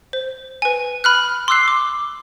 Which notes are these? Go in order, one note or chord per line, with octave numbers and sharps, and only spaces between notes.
C5
B4 G#5
B5 F6 F#6
C6 D6 E6 F#6 C7
D6